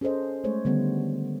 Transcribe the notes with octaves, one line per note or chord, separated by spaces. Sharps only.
C#4 G#4 A4 C5 D#5
G#3 A3 C5 C#5
D3 D#3 G3 B3